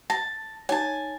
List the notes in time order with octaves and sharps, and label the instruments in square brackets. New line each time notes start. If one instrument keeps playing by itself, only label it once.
[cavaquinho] A5 [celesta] A#6
[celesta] D#4 C#5 [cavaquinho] G#5 A5